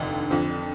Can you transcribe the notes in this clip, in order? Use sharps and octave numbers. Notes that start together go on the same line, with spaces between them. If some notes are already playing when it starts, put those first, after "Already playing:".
Already playing: F1 D#2 D3
F2 D3 F3